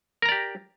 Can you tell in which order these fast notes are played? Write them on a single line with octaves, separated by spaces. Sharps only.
A#4 A#5 D5 G4